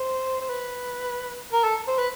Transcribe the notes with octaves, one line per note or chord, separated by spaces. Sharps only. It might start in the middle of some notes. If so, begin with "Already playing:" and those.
Already playing: C5
C5
B4
A#4
A4
C5
B4